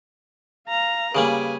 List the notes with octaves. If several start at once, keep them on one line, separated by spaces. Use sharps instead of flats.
F5 A#5
C#3 G3 A#3 B4 G#5